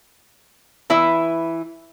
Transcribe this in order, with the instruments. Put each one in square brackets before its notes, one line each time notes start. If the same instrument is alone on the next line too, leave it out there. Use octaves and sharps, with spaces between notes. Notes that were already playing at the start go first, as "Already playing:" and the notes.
[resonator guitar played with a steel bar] E3 E4 B4 E5